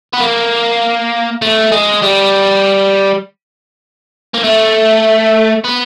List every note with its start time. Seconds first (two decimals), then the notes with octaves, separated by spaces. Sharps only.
0.13 B3
0.21 A#3
1.42 A3
1.72 G#3
2.02 G3
4.34 A#3
4.44 A3
5.65 B3